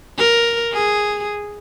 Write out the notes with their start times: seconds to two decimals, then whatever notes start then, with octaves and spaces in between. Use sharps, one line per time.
0.19 A#4
0.73 G#4